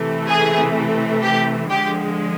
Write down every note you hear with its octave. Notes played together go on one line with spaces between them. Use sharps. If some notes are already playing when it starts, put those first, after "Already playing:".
Already playing: C3 E3 A3
G#4
G4
D3 F3 G#3 G4